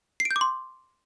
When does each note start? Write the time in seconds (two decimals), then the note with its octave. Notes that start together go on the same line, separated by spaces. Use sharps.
0.20 C7
0.25 D7
0.31 G6
0.36 D6
0.41 C6